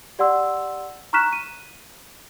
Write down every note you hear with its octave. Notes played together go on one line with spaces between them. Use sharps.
G4 D5 F#5 C6 E6
A#5 C#6 F6 F#6 B6 E7
D#7